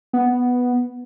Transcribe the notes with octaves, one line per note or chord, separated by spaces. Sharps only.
B3